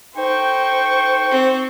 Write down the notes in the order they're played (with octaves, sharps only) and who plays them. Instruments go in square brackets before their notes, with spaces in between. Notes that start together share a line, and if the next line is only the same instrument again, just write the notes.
[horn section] D#4 A4 G5 [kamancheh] C5 C#6
[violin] C4